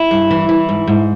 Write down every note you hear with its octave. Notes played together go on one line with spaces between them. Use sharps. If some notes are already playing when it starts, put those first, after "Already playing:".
Already playing: E4
G2
E3
E3
G#2
G#2